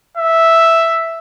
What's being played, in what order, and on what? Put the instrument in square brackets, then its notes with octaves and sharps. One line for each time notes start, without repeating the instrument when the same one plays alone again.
[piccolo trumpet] E5